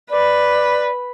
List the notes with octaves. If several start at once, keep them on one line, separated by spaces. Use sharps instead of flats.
B4 D5